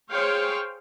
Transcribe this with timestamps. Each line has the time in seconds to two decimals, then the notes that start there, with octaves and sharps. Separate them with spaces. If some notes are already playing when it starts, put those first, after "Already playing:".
0.11 G#4 C5 C#5 F5 G5